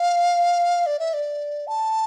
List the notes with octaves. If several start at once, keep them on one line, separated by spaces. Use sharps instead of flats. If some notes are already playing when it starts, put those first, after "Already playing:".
Already playing: F5
D5
E5
D5
A5